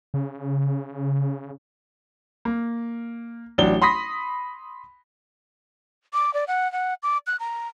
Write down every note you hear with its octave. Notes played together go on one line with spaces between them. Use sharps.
C#3
A#3
A1 F#3 D4 G7
B5 C6 D#6 A#6 B6
D6
D5
F#5
F#5
D6
F#6
A#5